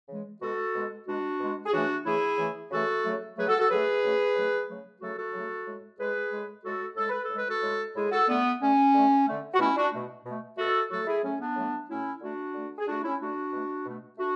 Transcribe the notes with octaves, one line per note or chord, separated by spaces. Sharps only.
C#3 E3 G#3
B2 G#3 F#4 A4
B2 G#3
B2 G#3 D4 F#4
B2 G#3
G#4
C#3 E3 A3 D4 F#4
C#3 E3 A3 E4 G#4
C#3 E3 A3
C#3 E3 A3 F#4 A4
C#3 F#3 A3
C#3 F#3 A3 G#4 B4
F#4 A4
F#4 A4
C#3 F#3 A3 G#4 B4
C#3 F#3 A3
C#3 F#3 A3
C#3 F#3 A3
C#3 F#3 A3 F#4 A4
F#4 A4
C#3 F#3 A3
A2 G#3
A2 G#3 G#4 B4
A2 G#3
A2 G#3 F#4 A4
A2 G#3 A4
B4
A4
A2 G#3 B4
F#4 A4
A2 G#3
A2 G#3 E4 G#4
F#4 A4
D3 A3 B3
D3 A3 C#4
D3 A3
D3 A3
F#4
B2 A3 C#4 E4
D4 F#4
B2 A3
B2 A3
B2 A3 F#4 A4
A2 F#3 A3 F#4 A4
E4 G#4
A2 F#3 A3 C#4
B3 D4
A2 F#3 A3
A2 F#3 A3 C#4 E4
D3 A3 D4 F#4
D3 A3
G#4
D3 A3 D4 F#4
C#4 E4
D3 A3 D4 F#4
B2 A3
B2 A3
A3 D4 F#4